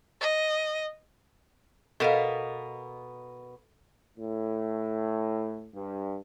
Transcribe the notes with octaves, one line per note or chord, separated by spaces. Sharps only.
D#5
B2 B3 A4 A#4 D#5 F5
A2
G2